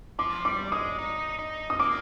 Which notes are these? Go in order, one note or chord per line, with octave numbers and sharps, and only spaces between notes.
F3 D6
G3 D6
G#3 D#6
D#4
D#4
D#6
A#3 D6